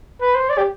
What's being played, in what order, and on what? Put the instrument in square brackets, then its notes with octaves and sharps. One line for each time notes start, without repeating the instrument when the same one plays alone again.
[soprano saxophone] B4
C5
D5
G4